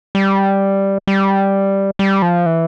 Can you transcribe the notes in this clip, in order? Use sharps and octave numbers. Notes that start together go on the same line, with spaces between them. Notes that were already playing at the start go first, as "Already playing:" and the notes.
G3
G3
G3
F3
E3